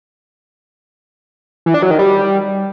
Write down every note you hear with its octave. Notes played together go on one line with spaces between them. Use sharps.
E3
D4
F#3
D#3
G3